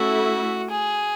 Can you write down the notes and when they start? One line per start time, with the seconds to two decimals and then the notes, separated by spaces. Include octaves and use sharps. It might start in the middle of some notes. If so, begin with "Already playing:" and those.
Already playing: A3 C#4 E4 F#4 A4 E5
0.70 G#4